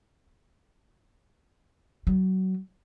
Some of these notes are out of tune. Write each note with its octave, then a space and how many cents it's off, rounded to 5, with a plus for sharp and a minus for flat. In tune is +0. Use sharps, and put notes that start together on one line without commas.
F#3 +25